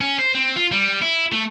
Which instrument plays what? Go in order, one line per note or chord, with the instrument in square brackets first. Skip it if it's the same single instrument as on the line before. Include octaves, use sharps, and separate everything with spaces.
[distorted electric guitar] C#4
C5
C4
F4
G3
E4
A3